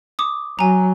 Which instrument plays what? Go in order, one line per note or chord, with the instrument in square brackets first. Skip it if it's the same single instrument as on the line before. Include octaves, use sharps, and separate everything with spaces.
[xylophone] D6 D#6
[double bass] F#3 [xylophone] G#5 A#5